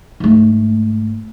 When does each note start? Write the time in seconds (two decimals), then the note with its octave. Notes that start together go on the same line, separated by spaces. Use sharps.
0.20 G#2 A3